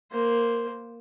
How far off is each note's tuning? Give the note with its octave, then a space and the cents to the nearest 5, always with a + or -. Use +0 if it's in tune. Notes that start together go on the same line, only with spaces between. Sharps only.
A#3 +0 C5 +0